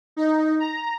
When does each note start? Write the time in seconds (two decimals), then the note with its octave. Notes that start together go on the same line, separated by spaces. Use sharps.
0.17 D#4
0.60 A#5